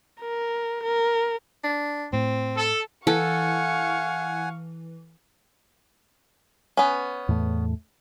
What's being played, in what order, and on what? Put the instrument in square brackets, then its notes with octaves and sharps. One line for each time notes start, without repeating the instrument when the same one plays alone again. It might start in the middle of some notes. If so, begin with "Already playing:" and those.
[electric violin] A#4
A#4
[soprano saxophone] D4
[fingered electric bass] A2 [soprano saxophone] C4
[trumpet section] A4
[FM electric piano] E3 [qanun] A4 [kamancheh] F5 C#6 [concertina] F#5 G#5
[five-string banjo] B3 C#4
[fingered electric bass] E2 A2 A3